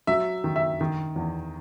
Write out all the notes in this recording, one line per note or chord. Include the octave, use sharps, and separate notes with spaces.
F#3 E5
D#3
E5
D#3
E2